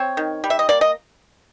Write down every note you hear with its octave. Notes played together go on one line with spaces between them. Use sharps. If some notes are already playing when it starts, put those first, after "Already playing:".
Already playing: C4 C#5
D#3
G3
E5
D#5
A#3 D5
D#5